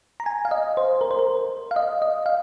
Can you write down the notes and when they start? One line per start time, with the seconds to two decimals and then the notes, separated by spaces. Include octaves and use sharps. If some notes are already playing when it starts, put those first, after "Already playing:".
0.20 A#5
0.26 G#5
0.45 F5
0.51 D#5
0.77 C5
1.01 A#4
1.11 C5
1.19 A#4
1.71 F5
1.76 D#5
2.02 D#5
2.26 F5